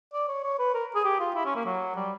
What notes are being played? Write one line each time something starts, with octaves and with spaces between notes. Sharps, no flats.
D5
C#5
C#5
B4
A#4
G#4
G4
F4
E4
C#4
A#3
F#3
G3